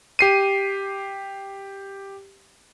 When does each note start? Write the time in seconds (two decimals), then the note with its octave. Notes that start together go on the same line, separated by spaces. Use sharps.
0.19 G4 C7 D#7